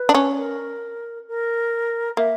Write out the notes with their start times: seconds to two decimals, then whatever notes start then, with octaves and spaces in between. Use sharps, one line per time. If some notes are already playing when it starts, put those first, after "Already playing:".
Already playing: B4
0.09 D4
0.14 C#4
0.37 A#4
1.28 A#4
2.17 A#3 E5